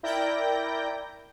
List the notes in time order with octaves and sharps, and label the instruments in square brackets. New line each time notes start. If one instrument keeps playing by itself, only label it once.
[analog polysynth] E4 A#4 D5 G5 G6 A#6